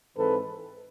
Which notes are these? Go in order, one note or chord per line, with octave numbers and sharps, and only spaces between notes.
G#2 E3 G#3 C4 A4 B4